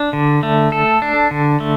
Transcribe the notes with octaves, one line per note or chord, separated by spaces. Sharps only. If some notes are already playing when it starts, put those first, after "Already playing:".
Already playing: D4
D3
A3
A4
D4
D3
A3